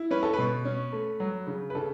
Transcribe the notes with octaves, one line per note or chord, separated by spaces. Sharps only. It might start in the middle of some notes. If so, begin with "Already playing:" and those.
Already playing: E4
C#4 B4
A4
B2 B4
C#4
A3
F#3
C#3
B4
C#3 A4